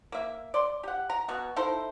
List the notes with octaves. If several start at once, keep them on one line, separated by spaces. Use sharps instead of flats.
A#3 E5
D5 C6
G4 F#5
A#5
B2 F#4
D#4 E4 A4 C5